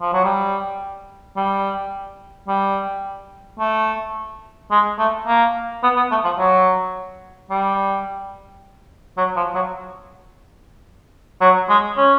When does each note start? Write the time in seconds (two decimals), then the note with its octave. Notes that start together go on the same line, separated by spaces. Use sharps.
0.01 F3
0.13 F#3
0.24 G3
1.37 G3
2.48 G3
3.59 A3
4.71 G#3
4.99 A3
5.27 A#3
5.83 B3
5.96 B3
6.11 A3
6.24 F3
6.38 F#3
7.50 G3
9.17 F#3
9.36 F3
9.55 F#3
11.41 F#3
11.69 G#3
11.97 C#4